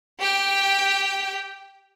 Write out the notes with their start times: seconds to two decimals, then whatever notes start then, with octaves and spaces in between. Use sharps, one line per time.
0.20 G4 G5